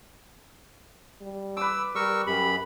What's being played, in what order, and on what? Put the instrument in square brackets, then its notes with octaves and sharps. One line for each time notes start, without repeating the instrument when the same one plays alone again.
[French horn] G3
[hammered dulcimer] B4 D6 [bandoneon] E6
[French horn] G3 [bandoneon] A#4 C#6 E6
[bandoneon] F#2 B5 [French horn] G4